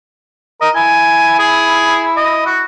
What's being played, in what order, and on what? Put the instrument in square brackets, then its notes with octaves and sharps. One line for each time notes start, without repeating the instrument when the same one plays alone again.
[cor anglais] A#4 [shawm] D#5
[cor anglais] E4 [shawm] G#5
[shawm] G#4
D#5
F#4